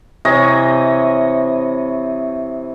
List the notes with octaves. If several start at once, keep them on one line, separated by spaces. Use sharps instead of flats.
C3 E3 C#5 D#5